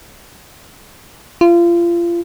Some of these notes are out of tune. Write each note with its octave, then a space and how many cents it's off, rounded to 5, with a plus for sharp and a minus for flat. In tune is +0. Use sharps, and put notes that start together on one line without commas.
F4 -30